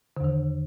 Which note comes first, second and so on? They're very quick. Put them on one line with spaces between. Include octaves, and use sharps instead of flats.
D3 E2 D#3